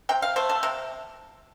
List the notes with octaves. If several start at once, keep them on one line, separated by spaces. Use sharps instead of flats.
C3 G5
F5
A3 C5
A4
C3